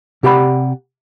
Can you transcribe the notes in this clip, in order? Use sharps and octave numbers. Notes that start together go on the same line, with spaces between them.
C3 G4 D5 F#5 B5